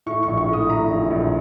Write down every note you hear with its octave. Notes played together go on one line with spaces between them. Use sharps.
A2 C#6
A#1 C#6
C#6
A2
D#6
A2 A#5
A#1
A#1